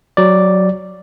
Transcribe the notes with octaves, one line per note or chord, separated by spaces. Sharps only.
F#3 D5